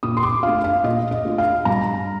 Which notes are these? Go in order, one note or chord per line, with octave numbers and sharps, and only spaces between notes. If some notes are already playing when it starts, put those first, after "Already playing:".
A#2 D#6
C6
D6
A3 D4 F4 F5
F5
A#2 D#5
D#5
A3 D4 F4
F5
G2 A#5